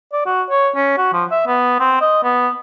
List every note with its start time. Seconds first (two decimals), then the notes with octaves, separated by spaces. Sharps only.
0.13 D5
0.26 F#4
0.50 C#5
0.75 C#4
0.98 F#4
1.13 F3
1.31 E5
1.47 B3
1.80 C4
2.01 D#5
2.23 B3